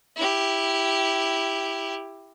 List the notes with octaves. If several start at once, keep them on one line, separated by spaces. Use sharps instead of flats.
E4 G4